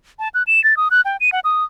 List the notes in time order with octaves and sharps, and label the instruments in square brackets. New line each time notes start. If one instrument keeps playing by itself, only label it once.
[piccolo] A5
F#6
E7
A6
D#6
F#6
G5
D#7
F#5
D#6